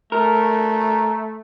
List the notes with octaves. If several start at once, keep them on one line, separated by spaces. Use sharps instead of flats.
A3 A#4